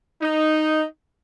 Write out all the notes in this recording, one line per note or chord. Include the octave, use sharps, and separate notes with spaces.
D#4